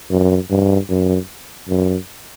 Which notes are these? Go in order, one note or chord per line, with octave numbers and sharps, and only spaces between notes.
F#2
G2
F#2
F#2